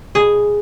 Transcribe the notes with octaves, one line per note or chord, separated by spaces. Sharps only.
B2 G#4